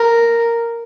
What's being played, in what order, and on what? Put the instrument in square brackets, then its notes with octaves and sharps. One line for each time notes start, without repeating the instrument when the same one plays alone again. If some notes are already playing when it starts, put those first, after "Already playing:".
Already playing: [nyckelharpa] A#4